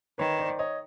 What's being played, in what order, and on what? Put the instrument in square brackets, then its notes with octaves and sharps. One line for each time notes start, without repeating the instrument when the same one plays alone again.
[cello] D#3 [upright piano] B4 C#5
[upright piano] C5 D5
C#5 D#5